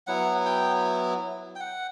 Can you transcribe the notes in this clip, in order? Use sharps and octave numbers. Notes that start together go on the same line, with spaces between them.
F#3 B3 E4 F#5
G5
G5
F#5